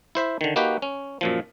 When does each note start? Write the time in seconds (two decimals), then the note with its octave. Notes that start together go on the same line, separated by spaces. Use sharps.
0.15 E4 C5 E5
0.41 D3 D#3
0.56 A#3 D#4 F#4 G4 B4
0.82 C#4
1.21 F#2 A#2 F3